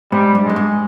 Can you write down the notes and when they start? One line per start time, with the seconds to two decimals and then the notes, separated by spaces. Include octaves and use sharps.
0.12 G#2 G3
0.35 G2
0.45 G2 G#3
0.56 G#2